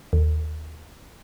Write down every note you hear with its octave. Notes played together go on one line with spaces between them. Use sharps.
D#2